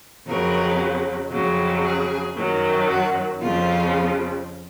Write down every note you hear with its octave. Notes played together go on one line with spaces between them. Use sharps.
F2 C#3 F#3 A#4
F2 C#3 F#3
G#4
F#2 D#3 F#3
F#4
F2 C#3 F3 F4